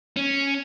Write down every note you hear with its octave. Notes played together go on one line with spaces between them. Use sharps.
C#4